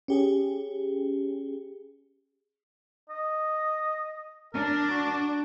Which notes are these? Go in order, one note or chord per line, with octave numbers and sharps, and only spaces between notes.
C#4 G4 G#4
D#5
D4 A#4
F#4